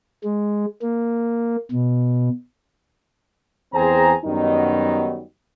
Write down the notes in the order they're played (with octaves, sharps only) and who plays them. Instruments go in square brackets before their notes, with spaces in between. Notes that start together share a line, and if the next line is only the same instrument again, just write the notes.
[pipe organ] G#3
A#3
B2
[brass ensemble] E2 C4 G#4 C5 G#5 A#5
F#2 D#3 F#3 G3 B3 D#4